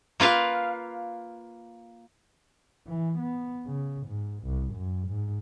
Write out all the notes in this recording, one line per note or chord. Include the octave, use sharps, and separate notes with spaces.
A#3 F4 B4 F5
E3
B3
C#3
G#2
C2
F#2
G#2